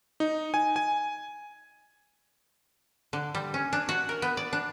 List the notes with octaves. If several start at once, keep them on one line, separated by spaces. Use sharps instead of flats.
D#4
G#5
G#5
D3
G3
C#4
D4
F#4
A#4
B3
D5
D4